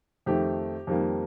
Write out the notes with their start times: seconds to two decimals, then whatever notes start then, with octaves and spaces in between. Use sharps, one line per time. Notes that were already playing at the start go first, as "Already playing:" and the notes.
0.26 F2 D#3 A3 G4
0.87 F2 D#3 G3 A#3